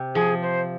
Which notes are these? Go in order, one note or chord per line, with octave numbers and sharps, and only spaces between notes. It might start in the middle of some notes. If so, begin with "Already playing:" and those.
Already playing: C3
F3 G#4
C5